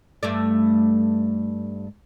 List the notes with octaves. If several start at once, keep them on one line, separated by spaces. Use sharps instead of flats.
G2 A3 D5